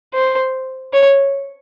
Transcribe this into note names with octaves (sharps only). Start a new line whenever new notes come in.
C5
C#5